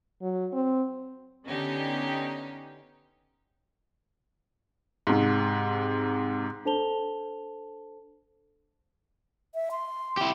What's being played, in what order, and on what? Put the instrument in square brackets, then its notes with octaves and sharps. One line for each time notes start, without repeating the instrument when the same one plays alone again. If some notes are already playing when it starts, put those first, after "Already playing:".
[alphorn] F#3
C4
[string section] D3 B3 C#4 D#4 G4
[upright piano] G#2 C3
[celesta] D4 A4 C5 A5 F7 G7
[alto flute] E5
C6
[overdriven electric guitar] E4 G4